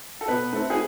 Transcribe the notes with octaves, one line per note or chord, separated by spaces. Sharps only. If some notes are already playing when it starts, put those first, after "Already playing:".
A4
B2 B4
A3 C4
G#4